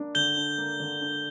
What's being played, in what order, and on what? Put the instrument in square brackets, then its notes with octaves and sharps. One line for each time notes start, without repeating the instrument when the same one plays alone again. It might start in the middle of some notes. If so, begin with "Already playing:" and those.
Already playing: [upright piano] A#3 D4
[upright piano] D3 [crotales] G6 G7
[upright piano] D4
A#3
D3
D4